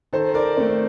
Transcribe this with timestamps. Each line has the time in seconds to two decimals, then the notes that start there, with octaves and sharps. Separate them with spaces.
0.13 D#3 A4 C5
0.34 A#4 D5
0.57 A3 C4